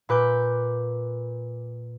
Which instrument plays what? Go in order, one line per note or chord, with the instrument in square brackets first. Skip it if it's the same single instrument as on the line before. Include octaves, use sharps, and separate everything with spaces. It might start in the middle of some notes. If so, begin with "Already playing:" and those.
[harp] A#2 B4 D6 G6